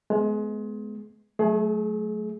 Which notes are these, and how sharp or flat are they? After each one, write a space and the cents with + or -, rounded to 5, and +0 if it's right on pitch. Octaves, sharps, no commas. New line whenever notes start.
G#3 +30 B3 +15
F#3 +0 A3 -20 G#4 +30